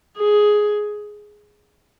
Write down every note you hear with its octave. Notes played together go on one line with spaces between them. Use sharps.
G#4